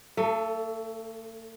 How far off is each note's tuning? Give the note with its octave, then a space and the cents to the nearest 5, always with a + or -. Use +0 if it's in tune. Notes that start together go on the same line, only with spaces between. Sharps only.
A3 +40 A4 +0